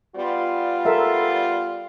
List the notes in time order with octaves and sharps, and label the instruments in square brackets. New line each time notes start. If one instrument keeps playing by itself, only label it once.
[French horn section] G3 B3 F4
[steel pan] A4 A#4 E5